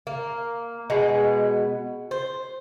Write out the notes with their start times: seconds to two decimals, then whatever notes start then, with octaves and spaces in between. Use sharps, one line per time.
0.07 A#3
0.90 B2 G#3 B3
2.11 C5